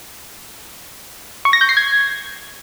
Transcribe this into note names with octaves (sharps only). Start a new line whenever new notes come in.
C#6
A#6
G6
C7
G#6